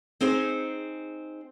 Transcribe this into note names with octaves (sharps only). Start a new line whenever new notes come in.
C4 D#4 G#4 C5